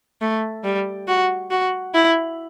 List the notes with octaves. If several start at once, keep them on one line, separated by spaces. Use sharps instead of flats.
A3
G3
F#4
F#4
E4